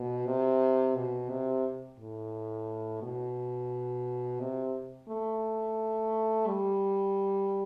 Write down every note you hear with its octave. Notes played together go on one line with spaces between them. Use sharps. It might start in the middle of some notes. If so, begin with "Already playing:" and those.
Already playing: B2
C3
B2
C3
A2
B2
C3
A3
G3